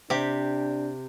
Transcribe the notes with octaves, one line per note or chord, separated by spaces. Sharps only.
C3 D4 G4